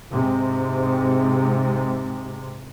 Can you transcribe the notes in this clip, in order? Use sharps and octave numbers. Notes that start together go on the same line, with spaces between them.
G#2 C3